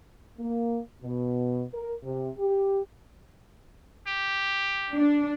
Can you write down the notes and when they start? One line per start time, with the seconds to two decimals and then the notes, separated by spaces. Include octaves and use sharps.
0.38 A#3
1.02 B2
1.73 A#4
2.04 C3
2.39 G4
4.07 G4
4.93 D4